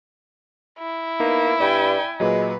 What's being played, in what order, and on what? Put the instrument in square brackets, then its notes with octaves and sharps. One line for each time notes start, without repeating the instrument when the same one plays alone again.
[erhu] E4
[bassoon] A#3 [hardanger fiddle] B3 [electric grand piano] D#4
[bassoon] G2 [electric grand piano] D5 B5 [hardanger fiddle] G5 G#5
[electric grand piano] A#2 F#3 [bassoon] G#3 [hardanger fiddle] B4